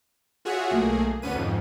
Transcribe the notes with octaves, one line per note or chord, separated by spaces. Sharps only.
F4 F#4 G#4 C#5 E5 F#5
B1 A3 A#3 G#4
D2 D3 B3 C#4 B4 D#7
F2 G#2 F3